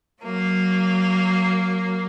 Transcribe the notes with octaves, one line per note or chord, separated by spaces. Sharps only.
F#3 A#3